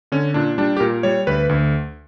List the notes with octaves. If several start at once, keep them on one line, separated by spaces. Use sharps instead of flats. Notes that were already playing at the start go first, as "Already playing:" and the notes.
D3 C#4
A#2 D4
G3 D4
G4
A#2 A#4
G3 C#5
D2 B4
D2